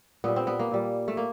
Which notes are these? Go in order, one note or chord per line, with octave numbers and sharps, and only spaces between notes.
A#2 G3 B3
C4
B3
A#3
A#2 G3
A3
A#3